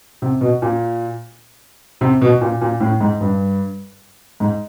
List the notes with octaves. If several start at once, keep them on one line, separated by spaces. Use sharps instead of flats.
C3
B2
A#2
C3
B2
A#2
A#2
A2
G#2
G2
G#2